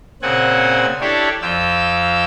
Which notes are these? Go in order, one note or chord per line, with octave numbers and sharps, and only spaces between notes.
A#2 C#3 C4 F#5 G#5
D4 E4 G4 A4 C#5 D5
F2 F4 G5 E6